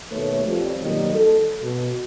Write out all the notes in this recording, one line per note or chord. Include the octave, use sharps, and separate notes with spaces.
D#2 B2 A3 B4 C#5
F2 F3 G3
B2 D#3 F#3 G3 A#3 D#5
A4
B2